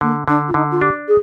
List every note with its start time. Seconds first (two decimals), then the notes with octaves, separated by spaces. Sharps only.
0.01 D3 A#3
0.28 D3 D4
0.48 F4
0.54 D3 D#4
0.71 F4
0.81 D4 G4
1.08 G#4